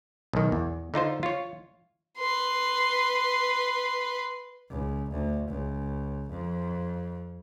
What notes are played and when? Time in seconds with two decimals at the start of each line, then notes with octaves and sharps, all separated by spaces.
0.33 B1 D#3
0.52 E2
0.94 D3 D#4 F4 C5
1.23 F4 C#5
2.18 B4 C6
4.70 C#2
5.11 D2
5.49 C#2
6.29 F2